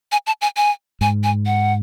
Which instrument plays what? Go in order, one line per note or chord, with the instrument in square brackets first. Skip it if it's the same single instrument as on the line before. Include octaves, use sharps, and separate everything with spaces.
[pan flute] G#5
A5
G#5
G#5
[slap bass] G#2 [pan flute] G#5
[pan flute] G#5
F#5